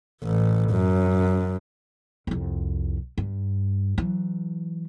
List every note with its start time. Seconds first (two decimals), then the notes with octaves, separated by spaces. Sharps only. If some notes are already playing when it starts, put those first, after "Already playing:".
0.24 A1
0.71 F#2
2.27 C2 F2
3.18 G2
3.98 E3 F#3